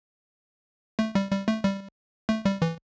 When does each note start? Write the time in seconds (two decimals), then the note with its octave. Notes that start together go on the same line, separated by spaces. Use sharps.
0.99 A3
1.15 G3
1.31 G3
1.48 A3
1.64 G3
2.29 A3
2.45 G3
2.62 E3